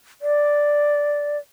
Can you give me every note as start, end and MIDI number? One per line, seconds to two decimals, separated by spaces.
0.22 1.37 74